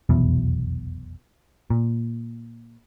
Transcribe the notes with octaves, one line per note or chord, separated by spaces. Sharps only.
F1 B1 E2 B2
A#2